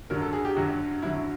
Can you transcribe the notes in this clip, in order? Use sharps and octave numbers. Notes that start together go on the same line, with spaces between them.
F#2 D3 F#3 A#4
A4
G#4
G4
F#2 D3 F#3 F#4
F#2 D3 F#3 E4